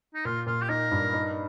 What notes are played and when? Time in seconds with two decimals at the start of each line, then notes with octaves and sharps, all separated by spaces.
0.14 D#4
0.25 A#2 F4
0.47 A#2 F4
0.62 G4
0.69 D#4 A#4
0.92 G2
1.13 D#4